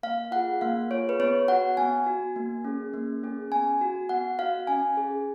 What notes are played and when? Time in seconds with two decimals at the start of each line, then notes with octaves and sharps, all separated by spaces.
0.03 A#3 F5
0.31 F4 G#4 F#5
0.61 A#3 F5
0.90 F4 G#4 C#5
1.09 B4
1.20 B3 C#5
1.48 F#4 F#5
1.77 B3 G#5
2.06 F#4
2.36 A#3
2.64 C#4 G#4
2.94 A#3
3.23 C#4 G#4
3.52 B3 G#5
3.81 F#4
4.09 B3 F#5
4.39 F#4 F5
4.67 C#4 G#5
4.97 G#4